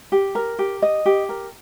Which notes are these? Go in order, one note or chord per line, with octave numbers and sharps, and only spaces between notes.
G4
A#4
G4
D#5
G4
A#4